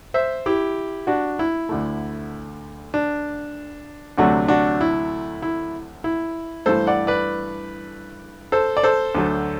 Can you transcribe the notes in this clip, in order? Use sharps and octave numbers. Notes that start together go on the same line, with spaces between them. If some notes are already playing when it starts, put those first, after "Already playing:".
C5 E5
E4 G4
D4 F#4
E4
D2 D3 A3
D4
D2 C3 F#3 A3 D4 F#4
D4 F#4
E4
E4
E4
G2 E3 A3 A4 C5
D5 F#5
B4 D5
A4 C5
D5
A4 C5
D2 D3 F#3 A3